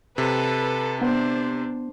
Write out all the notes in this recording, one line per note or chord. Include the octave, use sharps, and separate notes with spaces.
C3 A4 B4
B3 D4 C5